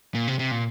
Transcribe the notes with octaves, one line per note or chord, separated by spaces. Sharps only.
A#2
C3
C3
A#2